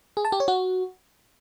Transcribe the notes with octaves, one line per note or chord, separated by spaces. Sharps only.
G#4
A5
G4
C#5
F#4